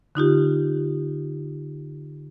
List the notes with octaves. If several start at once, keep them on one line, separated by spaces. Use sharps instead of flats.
D3 D#4 F4 G4